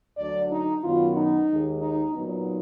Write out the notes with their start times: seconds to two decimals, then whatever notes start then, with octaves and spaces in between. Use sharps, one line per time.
0.18 D2 D3 F#3 D4 D5
0.51 D#4
0.83 F#2 D#3 F#3 B3 F4
1.16 D#4
1.50 D#2 D#3 G#3
1.82 D#4
2.15 A#2 F#3 B3 D#4